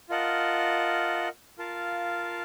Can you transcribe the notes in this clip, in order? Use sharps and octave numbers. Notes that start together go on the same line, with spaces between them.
F4 A#4 D#5 F#5 A5
F4 A#4 F5 A5